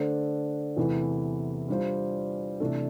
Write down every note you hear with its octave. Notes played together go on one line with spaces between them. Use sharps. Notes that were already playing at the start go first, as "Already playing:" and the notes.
Already playing: D3 A3 D4 A4 C5
E2 C3 E3 A3 E4
G3 D4 F4 C5
C3 E3 A3 D4 A4